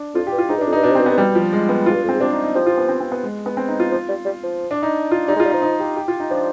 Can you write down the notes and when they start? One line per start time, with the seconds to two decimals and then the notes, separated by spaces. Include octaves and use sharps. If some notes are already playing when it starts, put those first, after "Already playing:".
Already playing: D4
0.15 F2 F4
0.27 G4
0.32 G2
0.38 F4
0.49 G#2 D#4
0.58 G2
0.61 D4
0.66 F2
0.73 G2 D#4
0.83 B2 D4
0.92 C3
0.95 B2 C4
1.06 G2 B3
1.18 B2 G3
1.35 F3
1.53 G#3
1.69 B3
1.86 G#2 F4
1.94 G2
2.03 F2
2.09 G#2 C4
2.20 C3 D4
2.32 D#4
2.43 D#4
2.55 F3 G4
2.66 F4
2.78 B3
2.89 C4
3.00 C4
3.12 B3
3.23 G#3
3.46 B3
3.57 C4
3.68 D#4
3.80 F4
3.92 F3
4.09 G3
4.25 G3
4.43 F3
4.71 D4
4.83 D#4
5.11 F4
5.28 G3 D#4
5.36 G#3
5.40 F4
5.45 G3
5.51 D#4
5.54 F3
5.62 D#4
5.80 G4
5.97 G4
6.08 F4
6.20 D#4
6.30 F3 D4